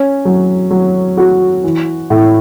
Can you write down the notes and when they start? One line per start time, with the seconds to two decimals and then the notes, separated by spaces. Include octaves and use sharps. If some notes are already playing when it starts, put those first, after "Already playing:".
Already playing: C#4
0.25 F#3
0.71 F#3
1.17 F#4
1.64 E3
2.10 A2